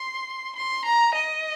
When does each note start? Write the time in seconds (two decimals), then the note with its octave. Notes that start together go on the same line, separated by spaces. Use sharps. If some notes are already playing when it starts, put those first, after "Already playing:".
Already playing: C6
0.56 C6
0.85 A#5
1.15 D#5